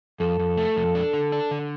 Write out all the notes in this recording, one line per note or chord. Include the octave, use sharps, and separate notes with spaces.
F2 A4
F2
A3
F2
D4
D3
D4
D3